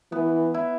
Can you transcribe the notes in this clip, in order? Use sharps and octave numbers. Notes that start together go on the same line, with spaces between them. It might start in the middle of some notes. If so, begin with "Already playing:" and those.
E3 B3
E4